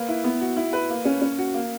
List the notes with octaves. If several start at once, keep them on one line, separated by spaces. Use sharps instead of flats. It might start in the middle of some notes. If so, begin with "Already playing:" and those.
Already playing: A#3 B4
E4
B3
F#4
E4
B4
A#3
C#4
C#4
F#4
A#3